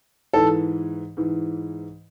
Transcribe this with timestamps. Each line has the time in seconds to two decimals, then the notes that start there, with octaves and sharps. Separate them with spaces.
0.33 G#2 E3 A4
1.17 G#2 E3